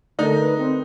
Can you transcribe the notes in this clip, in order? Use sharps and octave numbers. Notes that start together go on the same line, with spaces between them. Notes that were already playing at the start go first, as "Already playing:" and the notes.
D3 A3 D#4 A4 A#4
B4
C4